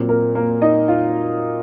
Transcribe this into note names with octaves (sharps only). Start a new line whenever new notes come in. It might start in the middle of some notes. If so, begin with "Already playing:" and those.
Already playing: A#2 F#3 C4
A#3 A#4
A#3 A#4
D#4 D#5
F4 F5